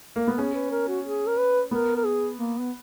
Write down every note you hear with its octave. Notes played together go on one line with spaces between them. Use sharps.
A#3
B3
A#4
C#4 G#4
B4
A#4
F#4
G#4
A#4
B4
B3 A#4
A#4
G#4
A#3
B3